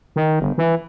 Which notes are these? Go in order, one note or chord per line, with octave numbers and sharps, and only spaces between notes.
D#3
G1
E3